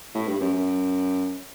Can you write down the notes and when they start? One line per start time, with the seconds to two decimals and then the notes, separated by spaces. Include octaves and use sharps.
0.15 A2
0.28 G2
0.41 F#2
0.53 F#2